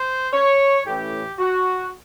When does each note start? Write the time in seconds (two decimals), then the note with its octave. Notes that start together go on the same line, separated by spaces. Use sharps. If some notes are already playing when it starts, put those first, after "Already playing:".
Already playing: C5
0.33 C#5
0.86 A2 E3 A3 C#4 G4
1.39 F#4